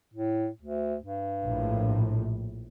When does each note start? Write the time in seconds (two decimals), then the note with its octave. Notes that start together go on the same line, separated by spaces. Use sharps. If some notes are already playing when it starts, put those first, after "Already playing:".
0.14 A2
0.62 D2
1.02 G2
1.45 A#1 A2